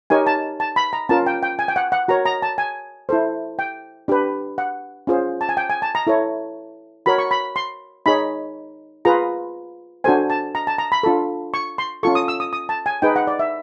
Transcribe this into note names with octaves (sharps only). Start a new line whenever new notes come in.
D#4 G4 A#4 C#5 G#5
A5
A5
B5
A#5
C#4 F4 A#4 A5
G5
G5
G#5
G5
F#5
F#5
F#4 A#4 C#5 A#5
A#5
A5
G#5
E4 A4 C5
G5
D4 G4 B4
F#5
C#4 F4 G#4 C5
A5
G#5
G5
G#5
A5
A#5
E4 A4 C#5
F#4 A#4 C#5 B5
C#6
B5
C6
D#4 G#4 C#5 B5
F4 G#4 B4 A#5
D4 F#4 A4 C5 G#5
A5
A#5
A5
A#5
B5
D4 F4 A4
C#6
C6
C#4 F4 A4 C#6
D#6
E6
D#6
D#6
A5
G#5
D#4 G#4 B4 G5
F#5
D5
E5